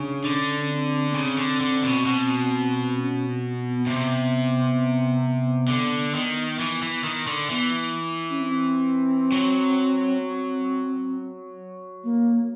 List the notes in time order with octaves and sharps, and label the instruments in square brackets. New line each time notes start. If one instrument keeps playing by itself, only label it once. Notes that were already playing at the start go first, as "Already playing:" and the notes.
Already playing: [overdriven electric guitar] C#3 [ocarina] D4
[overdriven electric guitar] D3 [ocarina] C#4
[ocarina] C#4
C4
B3
[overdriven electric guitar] C#3 [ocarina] C4
[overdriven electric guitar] D3
D3
B2
B2
[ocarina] C#4
C4
B3
[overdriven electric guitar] C3 [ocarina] B3
[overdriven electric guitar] D3
D#3
E3
E3
D#3
D3
[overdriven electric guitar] E3 [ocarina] B3
[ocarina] C#4
C4
[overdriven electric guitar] F#3
[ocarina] C4
A#3